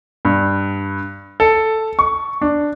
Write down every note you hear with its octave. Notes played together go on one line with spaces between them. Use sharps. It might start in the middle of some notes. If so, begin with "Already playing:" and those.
G2
A4
C#6
D4